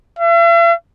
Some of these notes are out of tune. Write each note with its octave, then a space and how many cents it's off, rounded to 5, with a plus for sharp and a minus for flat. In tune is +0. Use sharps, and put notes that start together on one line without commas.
E5 +45